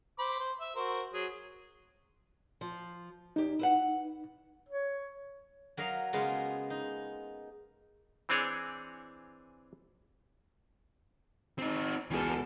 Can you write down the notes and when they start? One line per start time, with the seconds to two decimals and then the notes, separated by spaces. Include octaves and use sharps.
0.19 C5 B5 D6
0.39 C5
0.60 E5
0.76 F#4 A#4 C5
1.13 F#3 G#4
2.61 F3
3.36 E2 D#4 G4
3.59 E4 B4 F#5
4.69 C#5
5.77 F#3 A#4 D#5 F5
6.13 C#3 G#3 A#3 B3 F4 A#4
6.70 D#4
8.29 E3 C4 D4 G#4 C#5
11.59 C4 D#4
12.10 C#2 B2 E3 G#4 A4